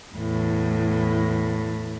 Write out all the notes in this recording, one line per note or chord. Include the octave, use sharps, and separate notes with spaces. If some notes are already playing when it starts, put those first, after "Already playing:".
E2 A2